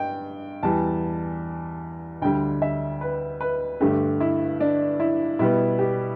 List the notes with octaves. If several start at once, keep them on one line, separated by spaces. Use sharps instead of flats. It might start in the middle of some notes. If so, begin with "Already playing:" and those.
Already playing: G2 G5
E2 E3 G3 A5
D2 D3 G3 G5
E5
B4
B4
G2 D3 A3 G4
E4
D4
E4
B2 G3 B3 E4
G4